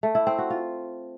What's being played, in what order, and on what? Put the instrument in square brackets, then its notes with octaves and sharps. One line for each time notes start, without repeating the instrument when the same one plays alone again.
[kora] A3
E4
C4
F#4
F4